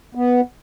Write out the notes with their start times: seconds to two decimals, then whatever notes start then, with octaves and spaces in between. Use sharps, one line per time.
0.15 B3